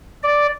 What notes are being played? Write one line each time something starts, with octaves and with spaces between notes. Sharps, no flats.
D5